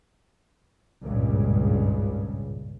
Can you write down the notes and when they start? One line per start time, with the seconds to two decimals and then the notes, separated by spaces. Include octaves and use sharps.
1.05 G#1 C#2 G2 A#2 C#3